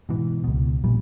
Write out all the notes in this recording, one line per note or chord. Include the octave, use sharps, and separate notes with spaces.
G#2 B2 E3
C#2 B2
A#1 F#2 A#2 G3